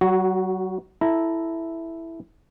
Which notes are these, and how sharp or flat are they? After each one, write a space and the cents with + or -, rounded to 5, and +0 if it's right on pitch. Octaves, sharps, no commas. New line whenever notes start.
F#3 +35 F#4 +0
E4 +0 A4 -5 A#5 +0